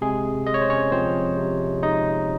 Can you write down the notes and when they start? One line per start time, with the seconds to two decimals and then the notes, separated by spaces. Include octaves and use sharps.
0.01 C3 G#3 G#4
0.47 G#3 D#5
0.54 C#5
0.62 C5
0.70 C#4 C#5
0.92 F3 C4 C5
1.37 C3
1.83 G#3 D#4 D#5